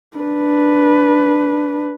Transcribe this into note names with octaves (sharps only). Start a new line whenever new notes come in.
D4 B4